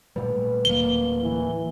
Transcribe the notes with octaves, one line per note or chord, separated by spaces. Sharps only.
A#2 G3 A3 B4
D1 A#3 G7
E3